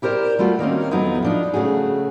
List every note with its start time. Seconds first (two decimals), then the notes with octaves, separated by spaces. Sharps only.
0.02 E4 G4 A#4 C5 D5
0.39 G3 A3 F4 F#4
0.59 D#3 A#3 C4 C#4
0.91 F2 F#3 B3 D#4 E4
1.23 F3 D4 D#4
1.54 C#3 A3 F#4 G#4